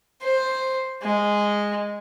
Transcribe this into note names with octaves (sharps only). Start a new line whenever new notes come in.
C5
G#3